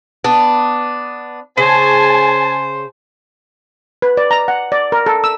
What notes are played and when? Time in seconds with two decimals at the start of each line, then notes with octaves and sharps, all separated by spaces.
0.24 B3 D4
1.57 C#3 C5 G#5 A5
4.02 B4
4.17 D5
4.31 A#5
4.48 F#5
4.72 D5
4.92 A#4
5.06 A4
5.24 E6